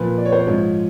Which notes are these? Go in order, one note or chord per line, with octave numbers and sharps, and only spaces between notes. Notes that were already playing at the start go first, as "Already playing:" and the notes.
Already playing: A#2 F3 B4
D5
C#5
C5
C#5
G#2 F3